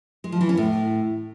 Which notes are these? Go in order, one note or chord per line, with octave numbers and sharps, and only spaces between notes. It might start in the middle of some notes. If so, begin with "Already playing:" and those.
G#3
F3
E3
C#4
A2